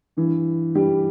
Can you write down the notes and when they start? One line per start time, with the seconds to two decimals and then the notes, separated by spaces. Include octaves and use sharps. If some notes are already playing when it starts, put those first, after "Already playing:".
0.17 G2 E3
0.75 G2 E3 G3 G4